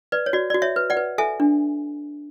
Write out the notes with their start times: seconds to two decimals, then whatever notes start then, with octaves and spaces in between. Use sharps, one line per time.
0.12 B4 D5
0.26 C#5
0.33 F#4 D5
0.50 F#4 D5
0.62 C#5 E5
0.76 B4
0.90 D5 F#5
0.97 B4
1.18 A4 E5 G#5
1.40 D4